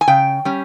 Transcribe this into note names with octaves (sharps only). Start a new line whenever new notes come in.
G#5
C#3 G5
G3 C#4